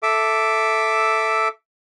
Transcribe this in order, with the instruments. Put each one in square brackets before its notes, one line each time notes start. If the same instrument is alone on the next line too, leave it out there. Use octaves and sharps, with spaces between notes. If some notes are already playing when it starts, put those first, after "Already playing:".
[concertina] A4 E5 D6